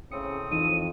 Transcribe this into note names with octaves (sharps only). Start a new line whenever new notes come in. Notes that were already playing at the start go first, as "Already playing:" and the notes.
A2 C#3 C4 D#6 C#7
F2 E3 D#4 D#7